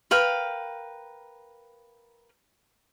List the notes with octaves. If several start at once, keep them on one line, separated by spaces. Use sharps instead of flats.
A#4 B4 F5 G5